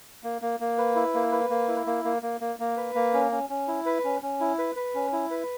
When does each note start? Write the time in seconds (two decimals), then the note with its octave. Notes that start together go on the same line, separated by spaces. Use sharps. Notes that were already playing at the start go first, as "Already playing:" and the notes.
0.24 A#3
0.42 A#3
0.60 A#3
0.78 B4
0.95 E4
1.14 A#3
1.32 B4
1.50 A#3
1.68 E4
1.86 A#3
2.05 A#3
2.22 A#3
2.41 A#3
2.59 A#3
2.77 B4
2.95 A#3
3.14 C#4
3.31 C#4
3.49 C#4
3.68 E4
3.86 B4
4.04 C#4
4.22 C#4
4.40 E4
4.59 B4
4.76 B4
4.95 C#4
5.13 E4
5.31 B4